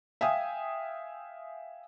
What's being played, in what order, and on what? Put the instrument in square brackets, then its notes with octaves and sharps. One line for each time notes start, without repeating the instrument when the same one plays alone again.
[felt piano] E5 F5 G5 G#5 D#6